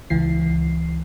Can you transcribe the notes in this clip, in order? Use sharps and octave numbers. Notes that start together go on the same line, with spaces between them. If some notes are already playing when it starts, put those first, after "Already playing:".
C#2 E3 C7